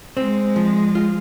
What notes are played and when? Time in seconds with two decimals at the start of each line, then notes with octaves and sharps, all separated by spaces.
0.17 G#3 C4
0.56 F3
0.95 F4